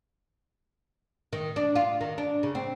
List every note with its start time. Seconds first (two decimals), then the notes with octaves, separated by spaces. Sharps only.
1.33 D#3
1.56 D4
1.76 F4
2.01 D#3
2.18 D4
2.43 C#3
2.55 C4